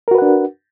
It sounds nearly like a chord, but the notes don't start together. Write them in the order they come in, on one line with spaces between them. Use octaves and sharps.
A#4 F#4 B4 F#5 D4